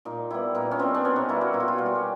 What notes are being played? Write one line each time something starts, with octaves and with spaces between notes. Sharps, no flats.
A#2 D#4
G3 B3 E4
A#2 D#4
C#4
G3 B3 C4
D4
B2 C#4
D#4
G3 A#3 E4
F#4
B2 F4
F#4
F4
G3 A#3
F#4
G4